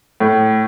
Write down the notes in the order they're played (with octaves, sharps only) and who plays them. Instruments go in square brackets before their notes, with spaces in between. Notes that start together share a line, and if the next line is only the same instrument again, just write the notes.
[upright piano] A2